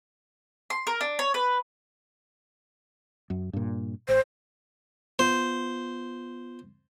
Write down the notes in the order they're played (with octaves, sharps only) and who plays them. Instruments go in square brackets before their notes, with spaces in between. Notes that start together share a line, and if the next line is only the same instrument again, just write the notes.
[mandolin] C6
A#4
D4
C#5
B4
[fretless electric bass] F#2
G2 A#2
[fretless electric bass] A1 [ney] C5
[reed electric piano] B3 F4 [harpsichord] C5